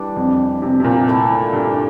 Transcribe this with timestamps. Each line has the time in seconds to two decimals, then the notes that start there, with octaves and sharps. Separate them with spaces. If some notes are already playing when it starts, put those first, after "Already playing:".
Already playing: E3 G3 D4
0.16 F2
0.62 C3
0.80 C3
0.84 A#2
1.08 D3 A3 E4
1.53 G2